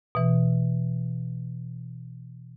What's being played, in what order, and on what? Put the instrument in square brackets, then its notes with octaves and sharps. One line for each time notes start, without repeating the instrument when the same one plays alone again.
[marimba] B2 E3